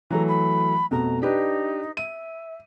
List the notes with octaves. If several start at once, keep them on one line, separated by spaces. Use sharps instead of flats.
E3 F#3 A3 A#5
B5
F2 B2 A3 A#5
D4 D#4 G4 B4
E5 D#7